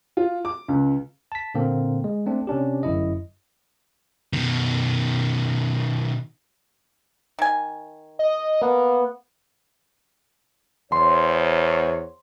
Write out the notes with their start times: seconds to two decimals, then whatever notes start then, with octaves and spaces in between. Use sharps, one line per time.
0.17 F4
0.45 D6
0.68 C#2
1.32 A5 B6
1.55 A#2 D3 A#3 C4
2.04 G#3
2.26 A3 C4 D4
2.47 C3 C#4 D4 G4
2.83 G1 F#2 E4 D#5
4.33 B2 D#3
7.39 D#3 G#5
8.19 D#5
8.62 A#3 B3
10.92 E2 C5 C#5 C6